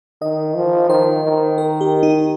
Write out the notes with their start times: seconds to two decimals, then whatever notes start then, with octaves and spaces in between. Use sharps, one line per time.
0.21 D#3 D#5
0.56 F3
0.89 D#3 C5
1.23 D#3
1.58 A#4
1.81 G4
2.03 D#4